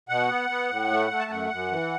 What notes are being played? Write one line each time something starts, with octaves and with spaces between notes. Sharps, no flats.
B2 F#5
B3
B3
A2
A3
A3
A5
F#2 F#5
F#2
E3